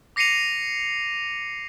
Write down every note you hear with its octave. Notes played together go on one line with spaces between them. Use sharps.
D6 A#6 C7 C#7 D#7 F7